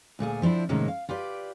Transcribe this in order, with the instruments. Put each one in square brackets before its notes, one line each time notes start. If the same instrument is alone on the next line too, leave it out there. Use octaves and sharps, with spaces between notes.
[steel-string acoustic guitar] D2 A#2 A3 G#4
F3 C4 D4 E4
A2 C3 D#3 G#3 A#3 C#4
F5
F4 G4 B4 D5